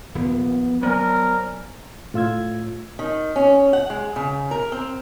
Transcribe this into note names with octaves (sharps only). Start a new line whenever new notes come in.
D#1 D#3 F3 B3
F#3 B3 A#4 C5 D5 G#5
A2 F4 E6 G#6
D#3
C#4
F#5
G#3
C#3
A#4
C4